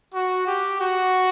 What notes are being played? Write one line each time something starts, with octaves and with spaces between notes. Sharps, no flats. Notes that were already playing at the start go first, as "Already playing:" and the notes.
F#4
G4
F#4